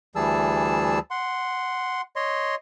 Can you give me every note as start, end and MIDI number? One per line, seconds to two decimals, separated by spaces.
0.16 0.99 38
0.16 0.99 52
0.16 0.99 55
0.16 0.99 68
0.16 0.99 81
0.16 0.99 88
1.11 2.01 78
1.11 2.01 84
2.16 2.55 73
2.16 2.55 75
2.16 2.55 84